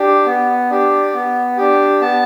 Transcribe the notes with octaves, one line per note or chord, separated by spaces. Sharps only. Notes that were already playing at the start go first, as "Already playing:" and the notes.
Already playing: D4 G4
B3
D4 G4
B3
D4 G4
B3 A5